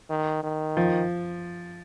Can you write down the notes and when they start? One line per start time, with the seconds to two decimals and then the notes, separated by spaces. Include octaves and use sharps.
0.10 D#3
0.44 D#3
0.77 F3